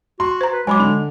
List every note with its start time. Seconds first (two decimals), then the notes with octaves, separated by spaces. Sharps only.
0.20 F#4 C6
0.41 C5 A#5
0.52 B4
0.67 F#3 G#3 C#5 G#5 B5 D6
0.80 D3 F7